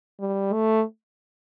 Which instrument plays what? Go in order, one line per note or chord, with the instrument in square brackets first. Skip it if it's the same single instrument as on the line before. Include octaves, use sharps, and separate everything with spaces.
[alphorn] G3
A3